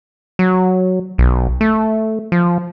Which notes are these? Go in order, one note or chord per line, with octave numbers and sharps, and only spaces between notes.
F#3
B1
A3
F3